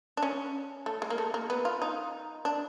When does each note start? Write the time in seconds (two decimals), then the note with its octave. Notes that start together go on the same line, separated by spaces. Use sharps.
0.17 D4
0.23 C#4
0.86 A3
1.02 G#3
1.10 A#3
1.18 A3
1.34 A#3
1.50 B3
1.65 F4
1.82 D#4
2.45 D4